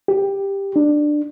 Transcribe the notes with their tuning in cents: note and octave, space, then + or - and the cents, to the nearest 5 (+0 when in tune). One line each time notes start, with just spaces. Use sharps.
G4 +10
D4 +15